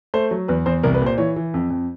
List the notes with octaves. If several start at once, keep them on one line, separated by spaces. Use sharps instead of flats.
A3 C5
F#3
E2 B4
E2 C5
C2 A#4
B4
A#2 C5
E3 C#5
E3
F2
F2